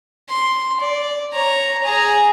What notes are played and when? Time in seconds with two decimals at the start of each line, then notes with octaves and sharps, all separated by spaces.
0.29 C6
0.80 D5
1.32 C#5 A#5
1.83 G#4 A#5